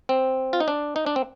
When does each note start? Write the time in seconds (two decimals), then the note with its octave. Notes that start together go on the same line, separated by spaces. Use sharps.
0.09 C4
0.53 F4
0.60 D#4
0.68 D4
0.96 D#4
1.06 D4
1.16 C4